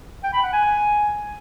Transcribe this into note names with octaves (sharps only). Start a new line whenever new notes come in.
G5
B5
F#5
G#5